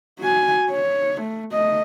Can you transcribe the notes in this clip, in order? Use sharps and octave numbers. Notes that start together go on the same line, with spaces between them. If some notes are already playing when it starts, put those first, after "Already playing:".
F#4 G#5
C#5
A3
A3 D#5